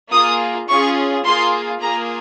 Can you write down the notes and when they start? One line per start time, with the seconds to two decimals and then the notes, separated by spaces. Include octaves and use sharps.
0.11 A#3 F4 G#4 D#6
0.68 C#4 F4 G#4 C#6
1.25 A#3 F4 G#4 C6
1.82 A#3 F4 G#4 A#5